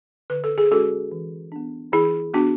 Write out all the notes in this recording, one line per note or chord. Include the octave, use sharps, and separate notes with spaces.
D3 B4
A4
G#4
G#3 C#4 F#4 A4
E3
B3 D4
E3 E4 G#4
B3 D4 F#4